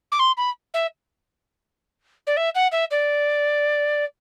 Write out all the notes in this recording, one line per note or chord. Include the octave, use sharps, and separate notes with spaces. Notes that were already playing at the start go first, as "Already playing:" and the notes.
D6
C6
B5
E5
D5
E5
F#5
E5
D5